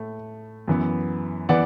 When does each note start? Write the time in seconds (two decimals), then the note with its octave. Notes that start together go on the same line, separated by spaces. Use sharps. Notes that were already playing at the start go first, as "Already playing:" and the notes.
Already playing: A2 A3
0.68 F#2 E3 B3
1.49 E3 B3 D5 F#5